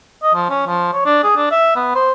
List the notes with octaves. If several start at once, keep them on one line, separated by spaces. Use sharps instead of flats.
D#5
F3
C#4
F3
C#5
D4
G#4
D4
E5
B3
C5